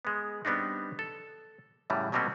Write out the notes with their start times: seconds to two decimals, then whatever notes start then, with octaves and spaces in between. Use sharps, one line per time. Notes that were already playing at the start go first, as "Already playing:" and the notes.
0.05 G#3 B3
0.45 G3 B3 C4 D4 D#4
0.99 A4
1.90 F#2 A2 C#3 E3 G3
2.12 B2 F#3 G3 A#3 C4 C#4